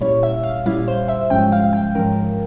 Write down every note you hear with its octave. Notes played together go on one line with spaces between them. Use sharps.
A#2 G3 C#4 E4 C#5
E5
F5
A#2 G3 C#4 E4 F5
C5
E5
G#2 F3 G#3 C#4 G5
F5
G5
G#2 F3 G#3 C#4 A#4